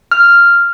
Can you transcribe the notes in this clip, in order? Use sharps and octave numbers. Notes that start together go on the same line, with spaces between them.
F6